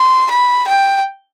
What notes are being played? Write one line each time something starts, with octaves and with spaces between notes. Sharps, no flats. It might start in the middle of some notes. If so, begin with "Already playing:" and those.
Already playing: C6
B5
G5